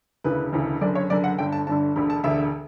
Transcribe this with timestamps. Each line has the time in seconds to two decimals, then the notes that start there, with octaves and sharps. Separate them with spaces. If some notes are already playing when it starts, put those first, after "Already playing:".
0.24 E1 D2 C#3 E3 B4
0.52 E1 D2 C#3 E3
0.81 F#1 F#2 D3 D5
0.95 C#5
1.10 F#1 F#2 D3 D5
1.24 F#5
1.39 G1 G2 D3 G5
1.52 A5
1.67 G1 G2 D3 A5
1.96 E1 D2 D3 B5
2.10 A5
2.24 E1 D2 D3 E5